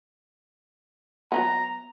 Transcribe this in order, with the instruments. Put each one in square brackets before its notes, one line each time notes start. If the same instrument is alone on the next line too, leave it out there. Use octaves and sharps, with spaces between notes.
[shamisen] F#3 A#3 B3 [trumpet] A#5